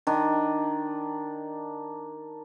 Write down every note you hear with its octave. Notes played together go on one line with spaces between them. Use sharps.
D#3 D4